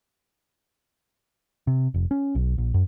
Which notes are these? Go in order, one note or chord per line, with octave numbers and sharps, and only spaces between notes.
C3
F1
C#4
B1
A#1
F#2